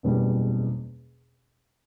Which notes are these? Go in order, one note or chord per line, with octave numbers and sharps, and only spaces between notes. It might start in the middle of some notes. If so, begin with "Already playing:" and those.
F#1 E2 B2 G3 D4